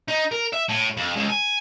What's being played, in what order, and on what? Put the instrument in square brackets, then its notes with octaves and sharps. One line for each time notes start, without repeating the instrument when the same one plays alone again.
[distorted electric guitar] D#4
A#4
E5
A2
F2
C#2
G#5